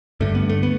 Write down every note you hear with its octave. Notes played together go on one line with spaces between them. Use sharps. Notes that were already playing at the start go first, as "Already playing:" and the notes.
G2 D3 A3
B3
A3
B3